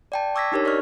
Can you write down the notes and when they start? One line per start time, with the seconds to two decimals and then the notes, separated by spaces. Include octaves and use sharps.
0.12 D5 G5 A5
0.35 C#6 D6 E6 G#6 A#6 B6
0.52 D4 D#4 G4 A#4 C#5
0.65 A#4 D5 D#5 C#6 F6